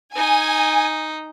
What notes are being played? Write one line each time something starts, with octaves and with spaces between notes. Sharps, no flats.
D#4 G#5